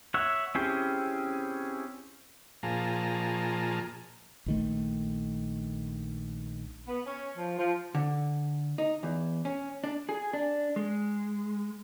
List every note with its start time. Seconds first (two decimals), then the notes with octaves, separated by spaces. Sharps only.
0.14 C#5 E5 F#5
0.55 C4 C#4 E4 G4 G#4
2.63 A#2 F3 G#4 A5 A#5
4.46 A#1 D#3 A3
6.88 B3
7.06 C#4
7.38 F3
7.58 F3
7.95 D3
8.78 D#4
9.03 E2
9.45 C#4
9.84 D4
10.09 G#4
10.33 D4
10.76 G#3